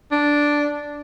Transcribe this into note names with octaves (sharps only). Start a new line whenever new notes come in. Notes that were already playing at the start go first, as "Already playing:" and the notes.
D4